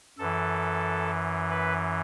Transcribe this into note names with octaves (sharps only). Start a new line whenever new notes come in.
F#2 E3 A4
B4